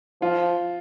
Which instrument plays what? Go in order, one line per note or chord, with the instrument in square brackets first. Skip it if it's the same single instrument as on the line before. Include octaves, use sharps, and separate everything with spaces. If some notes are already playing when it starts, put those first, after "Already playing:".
[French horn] F3 [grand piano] F4